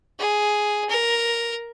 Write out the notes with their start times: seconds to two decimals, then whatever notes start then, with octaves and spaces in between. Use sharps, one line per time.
0.19 G#4
0.89 A#4